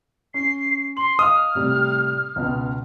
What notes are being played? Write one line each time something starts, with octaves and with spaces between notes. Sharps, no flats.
C#4 C7
C6 F#7
D#5 F5 D#6 F6
A2 C3 G3
C#2 B2